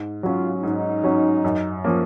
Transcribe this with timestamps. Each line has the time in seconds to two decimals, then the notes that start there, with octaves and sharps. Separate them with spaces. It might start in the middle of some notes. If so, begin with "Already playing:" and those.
Already playing: G#2
0.23 F#3 C#4 F4
0.63 G#2 D#4
1.04 F#3 C#4
1.44 F#2
1.84 F3 A#3 C#4